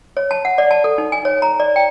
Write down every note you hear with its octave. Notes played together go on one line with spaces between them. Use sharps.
C#5
A5
F#5
D5
A5
A4
D#4
G#5
C#5
A#5
D5
G5